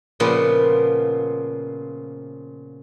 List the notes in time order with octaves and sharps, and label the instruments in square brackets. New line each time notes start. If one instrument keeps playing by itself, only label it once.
[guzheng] A#2 C#3 F3 B3